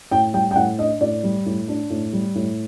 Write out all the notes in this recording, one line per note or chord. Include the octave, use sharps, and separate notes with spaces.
A2 G5
G3 G5
G5
A2 F#5
D4 D#5
A2 D5
G3
A2
D4
A2
G3
A2